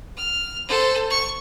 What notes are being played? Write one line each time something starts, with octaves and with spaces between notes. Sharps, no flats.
F6
A4 C5
C#6